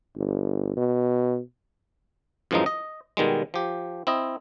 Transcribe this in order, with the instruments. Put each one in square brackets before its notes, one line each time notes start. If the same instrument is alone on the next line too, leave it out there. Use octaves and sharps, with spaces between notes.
[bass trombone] G1
B2
[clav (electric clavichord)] F#2 A2 E3 F3 G#3 D#4
D#5
B2 D#3 G3 G#3
F3 G4
C4 E4 D#5